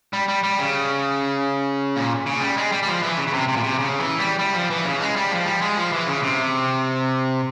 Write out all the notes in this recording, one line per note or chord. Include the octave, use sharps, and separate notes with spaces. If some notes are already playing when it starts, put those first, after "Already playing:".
G3
G3
G3
C#3
A#2
C#3
G3
G#3
G3
G3
F3
E3
C#3
C#3
C3
C3
A#2
C3
C#3
E3
G3
G3
F3
E3
C#3
G#3
G3
F3
G3
G#3
F3
E3
C#3
C3